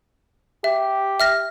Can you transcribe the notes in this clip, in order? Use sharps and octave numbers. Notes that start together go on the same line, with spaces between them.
G4 E5
E5 F6 A#6